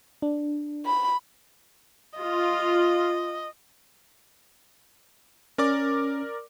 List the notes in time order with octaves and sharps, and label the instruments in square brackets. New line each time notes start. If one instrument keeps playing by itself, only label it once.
[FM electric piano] D4
[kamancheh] B5
[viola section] F4 [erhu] D#5
[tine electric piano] C#4 [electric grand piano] A#4 D5 D6